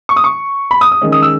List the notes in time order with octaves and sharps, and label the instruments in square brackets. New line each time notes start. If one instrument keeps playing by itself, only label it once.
[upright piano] C#6
D#6
C#6
B5
D#6
D#6
D#3 G#3 C#4
D#6
E6